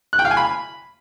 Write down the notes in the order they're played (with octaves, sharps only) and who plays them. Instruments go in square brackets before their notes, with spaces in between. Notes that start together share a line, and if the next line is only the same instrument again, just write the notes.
[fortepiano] F#6
G5
F5
G#5
B5